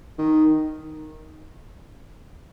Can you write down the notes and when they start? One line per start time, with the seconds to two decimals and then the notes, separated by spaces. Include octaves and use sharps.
0.18 D#3